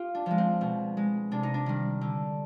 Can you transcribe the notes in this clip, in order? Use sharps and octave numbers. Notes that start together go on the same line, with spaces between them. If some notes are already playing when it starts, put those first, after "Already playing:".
Already playing: F4 G4
D4
F3 G#3
C4
B2
G#3
C3 D4
D#4
D4
D#3 G3
D3